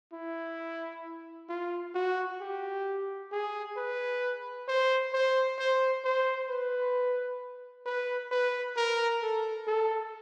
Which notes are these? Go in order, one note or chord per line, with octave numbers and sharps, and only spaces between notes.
E4
F4
F#4
G4
G#4
B4
C5
C5
C5
C5
B4
B4
B4
A#4
A4
A4